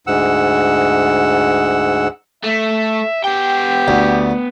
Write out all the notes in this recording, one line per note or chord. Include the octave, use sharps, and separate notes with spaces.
D2 G#2 F#5 E6
A3 E5
B3 G4 G5
D2